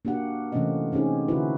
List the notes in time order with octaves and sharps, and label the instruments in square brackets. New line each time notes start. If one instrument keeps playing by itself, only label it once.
[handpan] A#3 D4 F#4 G4 F#5
C3 E3 A3 C4 C#4 D#5
C4 C#4 D#4 G4 G#4
D3 E4 F#4 B4